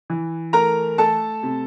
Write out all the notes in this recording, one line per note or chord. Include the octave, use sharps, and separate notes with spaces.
E3
A3 A#4 A#5
A3 A4 A5
C3